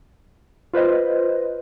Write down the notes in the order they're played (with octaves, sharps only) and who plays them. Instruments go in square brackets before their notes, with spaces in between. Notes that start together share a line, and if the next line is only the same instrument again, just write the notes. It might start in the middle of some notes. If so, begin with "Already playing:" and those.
[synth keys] F4 B4 C5 D#5